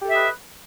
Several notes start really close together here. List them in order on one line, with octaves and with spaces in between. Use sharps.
G4 A4 E5 D#5 B4